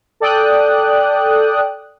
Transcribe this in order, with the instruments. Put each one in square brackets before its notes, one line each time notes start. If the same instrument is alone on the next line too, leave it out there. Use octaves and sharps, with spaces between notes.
[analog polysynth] A4 D5 G5 D#6 F#6